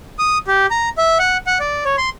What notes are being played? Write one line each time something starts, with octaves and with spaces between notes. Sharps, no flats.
D#6
G4
A#5
E5
F#5
F#5
D5
C#5
C6